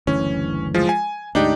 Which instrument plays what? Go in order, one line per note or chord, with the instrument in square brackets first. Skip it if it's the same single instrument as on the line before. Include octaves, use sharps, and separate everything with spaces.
[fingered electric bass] F#1 D2 E3 [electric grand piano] C#4
[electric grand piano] F3 G#3 F4
G#5
[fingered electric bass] D2 G#2 [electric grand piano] D4 D#4 G4